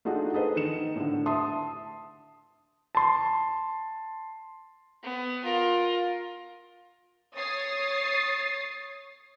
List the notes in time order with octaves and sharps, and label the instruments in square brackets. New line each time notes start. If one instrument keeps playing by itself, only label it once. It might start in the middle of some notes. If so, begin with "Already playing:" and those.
[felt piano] A3 D4 D#4 F4 F#4 G#4
G#4 A4 B4 C5 D#5
D#3 C#7 E7
A2 D3
E5 A5 C6 D#6
[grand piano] A5 C6
[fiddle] B3
F4 A#4
[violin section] C#5 D#6 A6 C7